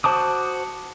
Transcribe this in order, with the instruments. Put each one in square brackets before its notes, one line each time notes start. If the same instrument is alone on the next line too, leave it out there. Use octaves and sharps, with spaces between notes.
[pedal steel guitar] F#4 C5 A5 D6 D#6